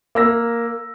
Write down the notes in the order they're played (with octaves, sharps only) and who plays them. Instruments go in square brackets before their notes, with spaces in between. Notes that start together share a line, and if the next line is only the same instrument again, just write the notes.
[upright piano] A#3 E6 A#6